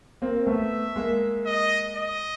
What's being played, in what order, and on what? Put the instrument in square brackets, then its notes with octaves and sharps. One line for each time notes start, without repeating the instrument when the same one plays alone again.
[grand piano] A#3 C4
[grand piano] A3 B3 [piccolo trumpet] E5
[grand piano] G#3 A#3
[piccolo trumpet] D#5
D#5